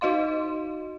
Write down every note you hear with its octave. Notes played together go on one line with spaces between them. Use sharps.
D#4 F#4 D#5 F5 C6